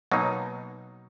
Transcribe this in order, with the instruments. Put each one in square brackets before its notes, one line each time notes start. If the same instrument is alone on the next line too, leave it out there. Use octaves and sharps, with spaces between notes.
[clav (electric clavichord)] B2 F#3 A#3 D#4